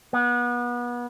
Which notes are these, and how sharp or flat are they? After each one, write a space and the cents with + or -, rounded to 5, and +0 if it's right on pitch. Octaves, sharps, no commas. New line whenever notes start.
B3 -30